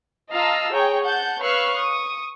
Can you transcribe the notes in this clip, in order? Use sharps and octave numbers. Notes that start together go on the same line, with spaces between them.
F4 D#5 F5 A5 A#5 E6
G#4 C#5 G5 A#5
F#5 A5 G6
B4 C#5 F5 C#6 E6 F#6
C#6 D#6